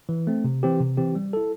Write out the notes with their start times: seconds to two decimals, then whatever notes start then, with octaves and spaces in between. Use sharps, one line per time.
0.09 E3
0.27 A3 C4
0.44 C3
0.63 E3 C4 G4
0.80 C3
0.97 E3 C4 G4
1.15 G3
1.33 E4 A4